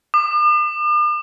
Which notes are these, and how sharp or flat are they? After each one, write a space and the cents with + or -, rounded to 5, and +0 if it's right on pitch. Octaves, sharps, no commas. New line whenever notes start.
D6 +45